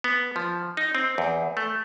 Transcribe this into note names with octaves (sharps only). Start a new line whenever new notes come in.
B3
F3
D#4
C4
E2
A3